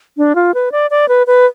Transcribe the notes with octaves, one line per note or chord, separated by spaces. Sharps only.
D4
F4
B4
D5
D5
B4
B4